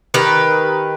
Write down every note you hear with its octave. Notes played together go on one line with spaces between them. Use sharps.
D#3 G4 B4